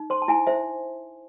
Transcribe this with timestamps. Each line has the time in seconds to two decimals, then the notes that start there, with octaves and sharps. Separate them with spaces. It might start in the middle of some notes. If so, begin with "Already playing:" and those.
Already playing: D#4
0.10 C5 C6
0.22 A5
0.28 E4 G#5
0.47 C5 E5